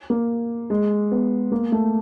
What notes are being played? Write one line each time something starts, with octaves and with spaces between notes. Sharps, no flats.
A#3
G#3
B3
A#3
A3